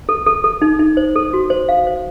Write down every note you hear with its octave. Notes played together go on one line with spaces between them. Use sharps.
A4
A4
A4
D#4
D#4
C5
A4
F#4
C5
F5
C5